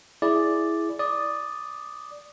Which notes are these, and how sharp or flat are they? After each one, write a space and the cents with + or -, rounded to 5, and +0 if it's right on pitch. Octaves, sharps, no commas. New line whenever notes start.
E4 +0 G#4 +10 D5 +0
D5 +0 D#6 -10